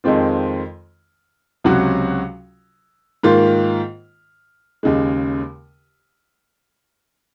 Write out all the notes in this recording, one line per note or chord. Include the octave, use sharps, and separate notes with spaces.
F2 D#3 G#3 C4 F4
C#2 C3 F#3 C#4 F#4
G#2 D#3 A#3 F4
D#2 C#3 G#3